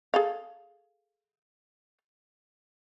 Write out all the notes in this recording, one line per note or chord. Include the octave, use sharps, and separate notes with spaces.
G#4 A4 F5